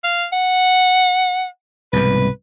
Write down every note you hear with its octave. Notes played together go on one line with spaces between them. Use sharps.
F5
F#5
C2 G#2 B2 B4